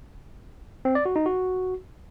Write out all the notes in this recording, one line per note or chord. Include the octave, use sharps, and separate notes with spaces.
C4
D5
F#4
D#4
F#4